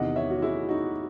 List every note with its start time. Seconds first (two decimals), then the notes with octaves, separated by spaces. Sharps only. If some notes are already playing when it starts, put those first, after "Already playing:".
Already playing: E2 C3 D#3 D#5 F#5
0.16 C#5 E5
0.30 F#4
0.42 E4 G#4
0.69 D#4 F#4